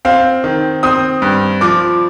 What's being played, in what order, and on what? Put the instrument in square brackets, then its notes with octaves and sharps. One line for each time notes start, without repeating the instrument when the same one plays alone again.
[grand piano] C4 [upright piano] F5
[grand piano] D#3
[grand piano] C4 [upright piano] D#6
[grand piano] G2
[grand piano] F3 [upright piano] D6